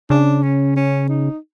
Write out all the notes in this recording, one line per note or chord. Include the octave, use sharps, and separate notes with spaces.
C#3 D4
C#4
C#4
D#4